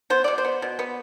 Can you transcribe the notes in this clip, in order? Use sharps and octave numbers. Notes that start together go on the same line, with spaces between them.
B3 C5
B2 D5
C5
B3
B2
B3